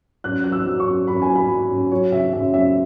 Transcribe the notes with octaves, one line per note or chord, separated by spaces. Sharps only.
F#2 F#6
F#3 F#6
E6
F#3
C#6
F#2
F#2 B5
G#5
F#3
B5
F#3
F#2
F#3 C#5
C#3 E5
F#2 E5
F#2 E5